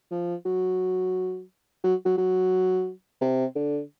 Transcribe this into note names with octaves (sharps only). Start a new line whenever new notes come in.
F3
F#3
F#3
F#3
F#3
C3
D3